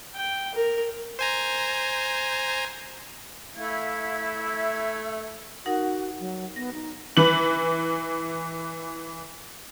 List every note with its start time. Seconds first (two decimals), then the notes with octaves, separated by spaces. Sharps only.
0.15 G5
0.55 A#4
1.19 C5 G#5 A#5
3.56 A3 E4 F5 G#6
4.58 E5
5.66 D#4 F#4 A#4 F#5
6.20 F#3
6.56 B3 A#6
6.74 D#4
7.17 E3 B4 F#7